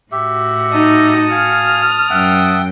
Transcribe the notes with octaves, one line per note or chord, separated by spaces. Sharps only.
A2 F#4 G4 E5
D#4 A5 D#6
F5 G#5 F6
F#2 E5 F#5 G5